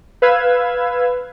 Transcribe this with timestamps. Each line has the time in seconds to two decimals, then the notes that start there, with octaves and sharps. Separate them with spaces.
0.22 B4 F5 E6 G#6